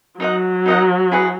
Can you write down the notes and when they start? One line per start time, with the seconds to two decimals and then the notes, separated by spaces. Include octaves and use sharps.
0.20 F#3 D#4 A#4 D#5 F#5
0.66 D#4 A#4 D#5 F#5
1.12 E4 G#4 B4 F#5